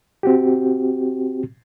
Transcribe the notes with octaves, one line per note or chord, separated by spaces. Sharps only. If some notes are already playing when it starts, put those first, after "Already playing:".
C4 F#4 G4